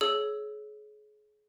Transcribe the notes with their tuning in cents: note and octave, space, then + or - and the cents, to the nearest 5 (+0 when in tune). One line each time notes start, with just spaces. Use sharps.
G#4 +30 C#5 +0 E6 +0